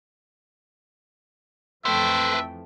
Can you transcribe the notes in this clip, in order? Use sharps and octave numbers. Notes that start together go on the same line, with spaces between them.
F2 E3 F3 A3 B4 C5 E5 G5